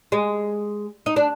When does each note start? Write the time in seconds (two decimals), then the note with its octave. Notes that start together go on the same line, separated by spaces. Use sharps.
0.12 G#3
1.06 D#4
1.16 D4